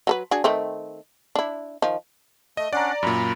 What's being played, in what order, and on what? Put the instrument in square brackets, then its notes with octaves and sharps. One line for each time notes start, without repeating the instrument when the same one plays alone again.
[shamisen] F#3 A4 B4
D4 F#4 G#4
D#3 A3 C4
D4 E4
D#3 F3
[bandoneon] A3 [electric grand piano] D#5
[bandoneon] C#4 D4 F#5 [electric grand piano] D5 A#5
[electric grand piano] F#2 A#2 [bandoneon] A#5 B5